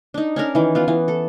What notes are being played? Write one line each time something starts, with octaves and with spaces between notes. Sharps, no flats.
D4 D#4
C#4 D4 A#4
D#3 E3
B3 F4
E3
A4